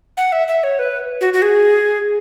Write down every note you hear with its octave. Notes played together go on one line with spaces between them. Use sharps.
F#5
E5
E5
C#5
B4
F#4
F#4
G#4